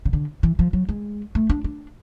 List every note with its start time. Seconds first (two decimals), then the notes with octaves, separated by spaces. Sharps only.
0.05 C#3
0.13 D3
0.43 E3
0.59 F3
0.73 F#3
0.89 G#3
1.35 A3
1.50 D4
1.64 D4